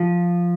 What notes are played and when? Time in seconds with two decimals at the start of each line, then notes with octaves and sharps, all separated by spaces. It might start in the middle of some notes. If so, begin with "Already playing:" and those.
Already playing: F3